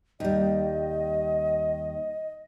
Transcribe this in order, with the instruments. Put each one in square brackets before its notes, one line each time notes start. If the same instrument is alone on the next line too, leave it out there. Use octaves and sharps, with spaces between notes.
[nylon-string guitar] D#2 G3 [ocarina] D#5